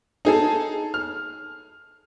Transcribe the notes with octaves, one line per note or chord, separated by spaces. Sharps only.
D#4 G#4 A4
F6